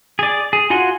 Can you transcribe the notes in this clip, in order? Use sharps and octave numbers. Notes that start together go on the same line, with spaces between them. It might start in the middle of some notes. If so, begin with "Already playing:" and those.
G#4 D5
G#4
F4 F#4 F#5 G#5 C6